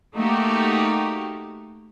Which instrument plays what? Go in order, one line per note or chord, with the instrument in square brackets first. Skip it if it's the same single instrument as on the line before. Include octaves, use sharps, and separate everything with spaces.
[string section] A3 A#3 D#4 F#4 G4